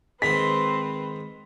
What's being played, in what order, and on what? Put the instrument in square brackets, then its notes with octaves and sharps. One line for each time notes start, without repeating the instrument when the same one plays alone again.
[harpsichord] G#2 D#3 C6 [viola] C4 B4 [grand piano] B6